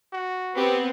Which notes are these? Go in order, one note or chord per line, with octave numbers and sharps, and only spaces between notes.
F#4
B3 C4 G4